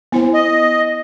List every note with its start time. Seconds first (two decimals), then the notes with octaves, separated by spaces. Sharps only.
0.12 B3 E4 C5
0.34 D#5